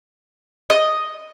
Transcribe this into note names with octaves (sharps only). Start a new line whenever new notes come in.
D#5